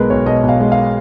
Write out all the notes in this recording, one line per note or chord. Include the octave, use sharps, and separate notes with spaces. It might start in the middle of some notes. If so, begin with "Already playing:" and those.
Already playing: B1 B2 G#3 G#4 A#4 B4
B1 C#5
B2 D#5
B1
F5
G#3
F5